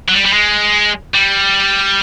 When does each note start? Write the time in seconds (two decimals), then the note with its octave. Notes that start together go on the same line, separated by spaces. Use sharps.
0.09 F#3
0.14 G3
0.26 G3
0.34 G#3
1.15 G3